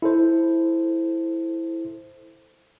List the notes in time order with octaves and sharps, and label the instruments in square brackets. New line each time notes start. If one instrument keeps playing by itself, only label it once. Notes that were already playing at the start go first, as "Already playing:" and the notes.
[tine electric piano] E4 A4 C5